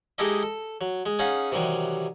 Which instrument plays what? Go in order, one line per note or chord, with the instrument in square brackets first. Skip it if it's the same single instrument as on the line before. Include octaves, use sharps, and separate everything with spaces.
[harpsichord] G#3 D#4 E4 G4 A4 D#5
A4
F#3
G#3
C#4 D#4 G#4 F5 F#5
C3 D#3 E3 F#3 G3